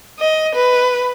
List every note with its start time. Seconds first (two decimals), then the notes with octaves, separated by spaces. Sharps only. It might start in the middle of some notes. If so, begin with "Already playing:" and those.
0.20 D#5
0.55 B4